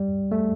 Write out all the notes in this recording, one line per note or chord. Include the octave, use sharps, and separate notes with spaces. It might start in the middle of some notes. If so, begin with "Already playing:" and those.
Already playing: G3
A3